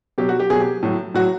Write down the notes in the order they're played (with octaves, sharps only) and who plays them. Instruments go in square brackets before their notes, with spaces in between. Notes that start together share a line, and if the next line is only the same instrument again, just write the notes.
[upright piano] B2 F#3 G4
F#4
G4
B2 F#3 G#4
G4
A2 F#3
A2 F#3 F#4